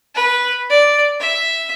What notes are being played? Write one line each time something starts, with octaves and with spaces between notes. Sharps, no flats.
B4
D5
E5